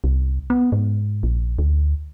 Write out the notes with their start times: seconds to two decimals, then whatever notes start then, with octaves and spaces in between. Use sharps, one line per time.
0.04 C2
0.50 B3
0.72 G#2
1.23 A#1
1.59 D2